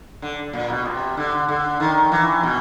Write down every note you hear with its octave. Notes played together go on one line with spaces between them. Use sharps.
D3
A#2
B2
C3
D3
D3
D#3
E3
B2